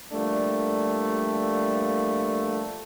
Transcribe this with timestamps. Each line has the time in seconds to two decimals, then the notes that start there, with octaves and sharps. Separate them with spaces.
0.13 F3 G3 A3 A#3 D4